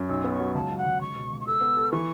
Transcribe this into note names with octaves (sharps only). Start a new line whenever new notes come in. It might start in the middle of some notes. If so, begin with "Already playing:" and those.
Already playing: F#2
B1 E6
B3
C#6
F#3
C#2 A5
F#3
F#5
C#2
C#2 C#6
B2
C#2
C#6
A4 E6
B3
A4
E3 C#6